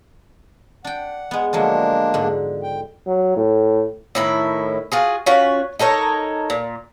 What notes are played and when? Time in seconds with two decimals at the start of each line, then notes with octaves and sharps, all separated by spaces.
0.85 D4 F#5 G5
1.31 G#3 B3
1.53 D3 F3 F#3 G#3 A#3 D4
2.14 G#2 D3
2.63 G5
3.07 F#3
3.37 A2
4.15 A2 D#3 E4
4.92 F4 F#4 G#4
5.26 C#4 F4 F#4 F#5
5.79 D#4 A4 A#4 C#5
6.50 A#2